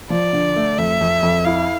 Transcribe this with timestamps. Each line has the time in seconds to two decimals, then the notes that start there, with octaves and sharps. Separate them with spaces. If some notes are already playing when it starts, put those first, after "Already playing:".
0.10 F3 D5
0.33 D3
0.56 A3
0.78 F2 E5
1.01 F2
1.23 F2
1.45 E4 F5